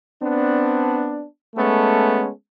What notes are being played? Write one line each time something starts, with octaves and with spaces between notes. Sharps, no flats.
B3 C4 D4
G#3 A3 B3 C#4 A4